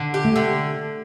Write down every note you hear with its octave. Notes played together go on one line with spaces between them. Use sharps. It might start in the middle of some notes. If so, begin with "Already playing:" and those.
Already playing: D3
G4
A3
D3